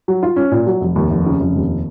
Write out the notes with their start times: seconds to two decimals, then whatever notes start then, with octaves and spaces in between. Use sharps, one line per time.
0.08 F#3
0.23 F4
0.36 C#4
0.51 A#2
0.67 F#3
0.81 F1
0.96 D#2
1.11 F1
1.26 C#3
1.41 F1
1.56 D#2